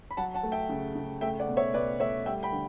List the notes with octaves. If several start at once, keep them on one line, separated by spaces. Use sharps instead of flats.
B5
F#3 F#5 A5
F#5 A5
A3
E5 G5
C#3
C#3
A3 E5 G5
D5 F#5
B2
C#5 E5
B2 B4 D5
A3 C#5 E5
G3 E5 G5
G5 B5
D3